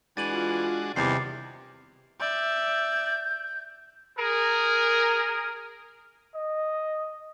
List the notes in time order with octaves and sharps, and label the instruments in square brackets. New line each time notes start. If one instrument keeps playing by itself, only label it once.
[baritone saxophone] E3 [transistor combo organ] G#3 D4 F#4 [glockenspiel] A6 D#7 F#7
[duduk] F4
[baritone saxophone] E2 [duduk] C3 [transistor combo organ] D#3 G3 C4 [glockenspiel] D6 A6 C7
[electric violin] D5 E5 [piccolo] G6
[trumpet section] G#4 A#4
[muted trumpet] D#5